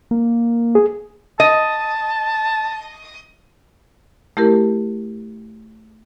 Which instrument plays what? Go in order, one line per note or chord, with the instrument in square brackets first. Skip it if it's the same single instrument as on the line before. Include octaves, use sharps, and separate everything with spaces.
[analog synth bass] A#3
[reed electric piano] G#4
[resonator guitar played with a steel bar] D#5 [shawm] A5
[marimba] A3 E4 G4 A#4